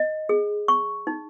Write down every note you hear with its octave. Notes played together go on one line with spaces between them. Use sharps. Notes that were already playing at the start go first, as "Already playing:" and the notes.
Already playing: D#5
G#4
C#6
D#4